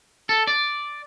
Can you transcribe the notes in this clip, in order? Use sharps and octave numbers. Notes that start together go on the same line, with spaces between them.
A4
D5